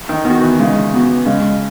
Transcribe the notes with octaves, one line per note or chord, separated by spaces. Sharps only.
D#3
D#3 B3 F#4
E3
C#3 G#3
B3 F#4
C#3 G#3